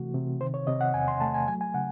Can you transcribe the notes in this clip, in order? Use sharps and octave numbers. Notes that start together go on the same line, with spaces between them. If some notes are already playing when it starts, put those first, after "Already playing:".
Already playing: C3 E3 A3 F#4
C3
D#3 C5
C#5
C3 D#5
F#5
E2 G#5
C6
A3 A5
G#5
F#3 G#5
G#5
C#3 F#5